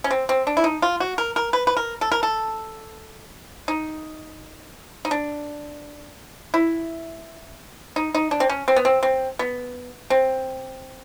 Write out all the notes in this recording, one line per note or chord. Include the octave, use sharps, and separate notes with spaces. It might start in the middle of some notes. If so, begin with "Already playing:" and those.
C#4
C4
C4
D4
E4
D#4
F4
F#4
A#4
A#4
B4
B4
A#4
A4
A#4
A4
D#4
D#4
D4
E4
D#4
D#4
D4
C4
C#4
C4
B3
C4
C4
B3
C4